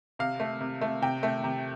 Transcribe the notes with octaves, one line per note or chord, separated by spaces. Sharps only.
C3 F5
A3
C3
A3
C3 G5
A3
C3